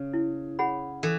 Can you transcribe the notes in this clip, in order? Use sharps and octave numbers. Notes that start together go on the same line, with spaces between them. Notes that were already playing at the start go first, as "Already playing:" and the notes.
Already playing: C#3
E4
G#4 C#5 F#5 B5
E3 A4